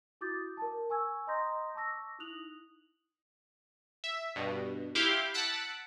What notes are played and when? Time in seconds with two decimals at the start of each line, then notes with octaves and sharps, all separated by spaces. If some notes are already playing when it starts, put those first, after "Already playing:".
0.21 E4 F#4 D6 D#6 G6 A6
0.57 A#4 A5
0.90 G#5 C#6 E6 G#6
1.27 D#5 A#5 C6 D#6 G6 A#6
1.75 A5 C#6 D6 E6 A#6
2.19 D#4 E4 D#6 F#6 F7 F#7
4.04 E5
4.36 G2 B2
4.95 E4 G4 F5 G5 C6 D6
5.34 F#5 A5 E6 F#6 B6 D7